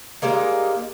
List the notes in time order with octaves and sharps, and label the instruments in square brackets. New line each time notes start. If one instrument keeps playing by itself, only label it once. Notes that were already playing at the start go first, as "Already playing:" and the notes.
[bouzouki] G3 G#3 A#3 D#4